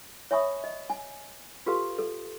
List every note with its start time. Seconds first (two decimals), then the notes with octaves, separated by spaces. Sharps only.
0.31 C#5 E5 G#5 B5 C#6 D#6
0.64 D#5
0.90 G#5
1.66 F4 G4 A4 B4 F5 C6
1.99 A4